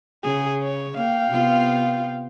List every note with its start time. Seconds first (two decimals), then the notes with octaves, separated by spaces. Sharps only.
0.24 C#3 G#4
0.63 C#5
0.97 A#3 F5 G5
1.28 C3 B3 F4